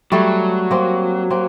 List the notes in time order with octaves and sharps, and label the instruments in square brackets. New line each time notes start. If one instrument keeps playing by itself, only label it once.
[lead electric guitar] F#3 [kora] G3 A3
[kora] A#3 C4
A#3 C4